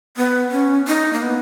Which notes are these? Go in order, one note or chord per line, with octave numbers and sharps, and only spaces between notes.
B3
C#4
D#4
A#3
B3